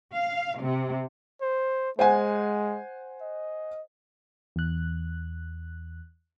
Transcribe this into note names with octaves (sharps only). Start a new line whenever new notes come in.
F5
C3
C5
G#3 C5 F#5 G#5
D#5
E2 F#6